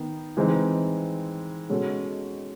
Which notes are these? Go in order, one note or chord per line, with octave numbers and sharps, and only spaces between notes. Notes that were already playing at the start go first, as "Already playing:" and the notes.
Already playing: D#3 B3
E3 G#3 C4 D#4
B2 G#3 C#4 F#4 A4